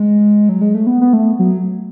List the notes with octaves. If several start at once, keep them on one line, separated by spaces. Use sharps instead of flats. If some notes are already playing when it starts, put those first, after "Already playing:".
Already playing: G#3
F#3
G#3
A3
B3
B3
A3
F#3